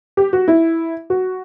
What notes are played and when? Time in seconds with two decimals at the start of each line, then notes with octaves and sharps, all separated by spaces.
0.17 G4
0.33 F#4
0.48 E4
1.10 F#4